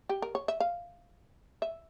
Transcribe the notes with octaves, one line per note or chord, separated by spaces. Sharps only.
G4
A#4
C#5
E5
F5
E5